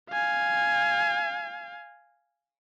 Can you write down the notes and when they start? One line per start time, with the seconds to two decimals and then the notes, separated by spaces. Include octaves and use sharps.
0.10 F5 G#5